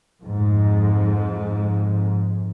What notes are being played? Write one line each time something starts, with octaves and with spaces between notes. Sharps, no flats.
F2 G#2